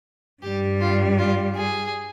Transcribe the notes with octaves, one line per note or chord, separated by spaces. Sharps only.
G2 G3 G4
F4
F4
G#4